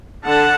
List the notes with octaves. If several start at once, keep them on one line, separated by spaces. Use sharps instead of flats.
D3 F#5 A5